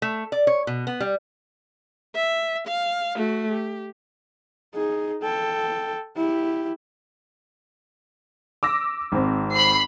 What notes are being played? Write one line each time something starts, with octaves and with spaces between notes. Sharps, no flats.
A3
D5
C#5
B2
B3
G3
E5
F5
A3 F#4
G4
D#4 G#4
A4 G5
E4 G4
D6 E6 A#6
G#1 C4
B5 C7